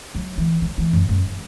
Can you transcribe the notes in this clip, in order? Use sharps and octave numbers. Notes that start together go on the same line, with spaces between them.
F#3
E3
F#3
E3
F#2
F#2